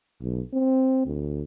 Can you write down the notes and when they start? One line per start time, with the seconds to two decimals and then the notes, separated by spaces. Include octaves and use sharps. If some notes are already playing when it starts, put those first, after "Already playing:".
0.21 B1
0.53 C4
1.06 D2